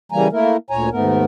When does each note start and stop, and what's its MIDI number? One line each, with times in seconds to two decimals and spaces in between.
0.12 0.28 49
0.12 0.28 52
0.12 0.28 55
0.12 0.28 58
0.12 0.28 80
0.12 0.28 82
0.32 0.57 57
0.32 0.57 58
0.32 0.57 64
0.32 0.57 70
0.70 0.89 38
0.70 0.89 46
0.70 0.89 73
0.70 0.89 80
0.70 0.89 82
0.92 1.25 39
0.92 1.25 44
0.92 1.25 57
0.92 1.25 59
0.92 1.25 70